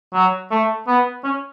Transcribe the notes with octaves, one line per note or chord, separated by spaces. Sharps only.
F#3
A3
B3
C#4